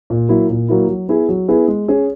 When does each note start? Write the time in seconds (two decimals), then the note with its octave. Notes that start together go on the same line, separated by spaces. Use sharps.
0.10 A#2
0.29 F#3 A#3 E4
0.50 A#2
0.68 F#3 A#3 E4
0.89 F#3
1.08 B3 E4 G#4
1.29 F#3
1.48 B3 E4 G#4
1.68 G#3
1.88 C#4 G#4